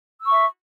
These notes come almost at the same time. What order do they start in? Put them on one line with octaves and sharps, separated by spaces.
E6 C#6 E5